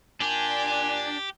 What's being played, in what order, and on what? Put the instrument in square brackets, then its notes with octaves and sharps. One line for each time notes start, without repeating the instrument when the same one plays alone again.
[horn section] A#2 G#5 [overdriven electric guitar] D4 [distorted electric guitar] G4